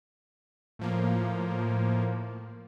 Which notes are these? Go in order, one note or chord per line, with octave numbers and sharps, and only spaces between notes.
A2 F3 A#3